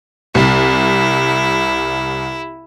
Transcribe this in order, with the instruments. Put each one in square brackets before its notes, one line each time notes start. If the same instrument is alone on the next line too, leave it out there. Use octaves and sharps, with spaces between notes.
[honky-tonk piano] C2 [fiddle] E4